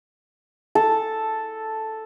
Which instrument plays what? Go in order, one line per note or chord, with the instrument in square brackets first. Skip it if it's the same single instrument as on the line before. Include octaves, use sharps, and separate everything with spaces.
[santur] A4